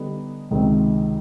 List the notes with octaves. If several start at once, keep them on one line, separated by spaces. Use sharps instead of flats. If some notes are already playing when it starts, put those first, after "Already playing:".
Already playing: D3 G3 B3 D#4
C#2 C3 D#3 G#3 C4